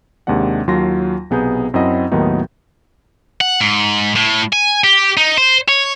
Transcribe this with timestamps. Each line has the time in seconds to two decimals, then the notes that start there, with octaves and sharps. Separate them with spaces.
0.27 D#2 C3 G#3 D4 F#5
0.67 D#2 F#3 F4 C6 A#6
1.30 B1 C3 B3 G#4 A#5 G6
1.74 F#2 C4 E4 D#5 F#5 B5
2.12 D#2 A2 D#3 F#3 B3 D#4
3.41 F#5
3.61 G#2
4.16 A2
4.53 G#5
4.84 G4
5.17 D#4
5.38 C5
5.69 C#5